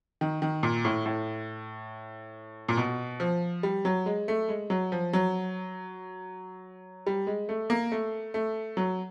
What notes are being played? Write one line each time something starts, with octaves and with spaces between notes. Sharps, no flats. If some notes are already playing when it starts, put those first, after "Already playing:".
D#3
D#3
A#2
A2
A2
A#2
B2
F3
G3
F#3
G#3
A3
G#3
F#3
F3
F#3
G3
G#3
A3
A#3
A3
A3
F#3